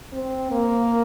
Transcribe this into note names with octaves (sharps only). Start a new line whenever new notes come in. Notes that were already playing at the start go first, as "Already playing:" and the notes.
C4
A#3